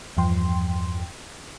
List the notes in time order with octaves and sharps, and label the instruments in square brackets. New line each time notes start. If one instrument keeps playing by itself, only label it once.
[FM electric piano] E2 G2 F3 G5 C6